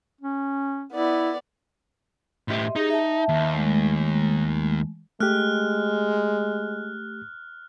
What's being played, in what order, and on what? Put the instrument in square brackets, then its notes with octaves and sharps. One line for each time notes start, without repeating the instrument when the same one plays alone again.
[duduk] C#4
[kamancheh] B3 D5 [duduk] E4
[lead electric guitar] A2 G4 [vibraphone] D#5 E5 C6
[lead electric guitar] D#4 [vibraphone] G4 G#4
[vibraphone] E5 A5
[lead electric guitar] D#2
[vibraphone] G#3 A3
[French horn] G#3 [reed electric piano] A3 G4 [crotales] F6 F#6